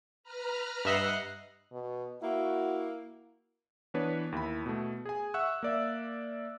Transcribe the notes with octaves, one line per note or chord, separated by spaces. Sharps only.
B4 A#5 F6
G2 D#5 E5 F#5 C7
B2
A#3 E4 F#4
E3 B3 D4 B4 C#5
D#2 E4 B5
B2 A3
G#4 G#5
E5 F#5 C#6 E6 F#6
A#3 D5 E5